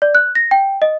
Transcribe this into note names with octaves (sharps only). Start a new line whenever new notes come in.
D5
F#6
A#6
G5
D#5